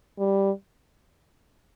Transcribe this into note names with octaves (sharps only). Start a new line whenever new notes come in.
G3